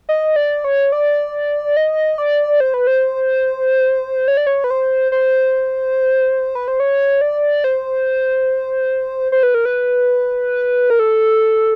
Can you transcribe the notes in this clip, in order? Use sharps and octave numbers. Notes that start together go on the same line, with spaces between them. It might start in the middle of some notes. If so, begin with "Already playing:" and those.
D#5
D5
C#5
D5
D#5
D5
C5
B4
C5
C#5
D5
C#5
B4
C5
C5
B4
C5
C#5
D5
C5
C5
B4
A#4
B4
A#4
A4